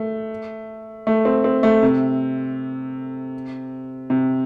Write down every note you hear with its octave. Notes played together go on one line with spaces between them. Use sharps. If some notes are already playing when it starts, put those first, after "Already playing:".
Already playing: A3
A3
C4
C4
A3
C3
C3